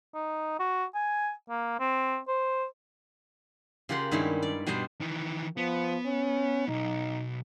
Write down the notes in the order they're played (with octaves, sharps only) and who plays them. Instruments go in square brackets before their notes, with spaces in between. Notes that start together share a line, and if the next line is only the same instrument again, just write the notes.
[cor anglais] D#4
F#4
G#5
A#3
C4
C5
[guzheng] C#3 F4 G4 A#4 F#5 C6
G2 D#3 G3 G#3 C#4 E4
D5
B2 G3 D4 C5 D#5
[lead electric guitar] D#3 E3
[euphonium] F3 [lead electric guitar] B3
[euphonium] C#4
[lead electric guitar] B1 [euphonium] D#4